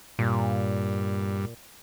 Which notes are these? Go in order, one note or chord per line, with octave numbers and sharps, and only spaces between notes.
G2 A#2